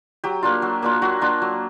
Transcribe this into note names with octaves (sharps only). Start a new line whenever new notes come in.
F#3 G4
A#3 D4 F4
F#3
A#3 D4 F4
F#3 F#4
A#3 D4 F4
F#3